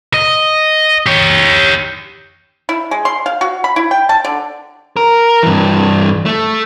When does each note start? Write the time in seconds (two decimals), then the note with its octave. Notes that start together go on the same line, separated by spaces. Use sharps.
0.14 D#5
1.06 G4 C#5
2.69 E4
2.91 G#3
3.05 C6
3.26 F5
3.41 F#4
3.64 B5
3.76 E4
3.91 G5
4.09 A5
4.24 D3
4.97 A#4
5.43 G2 E3
6.26 A3